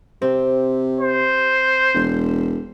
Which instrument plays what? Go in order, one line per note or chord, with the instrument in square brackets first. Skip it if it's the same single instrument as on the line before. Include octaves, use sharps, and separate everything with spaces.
[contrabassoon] C3 [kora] C4
[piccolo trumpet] C5
[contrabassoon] E1